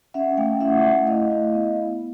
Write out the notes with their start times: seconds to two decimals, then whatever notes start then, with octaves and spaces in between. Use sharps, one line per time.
0.14 C#4 E5 F#5
0.37 A3 F5 G5
0.60 E4 E5 F#5
0.85 A3
1.07 E4 D#5 F5
1.31 E4
1.54 B3
1.77 B3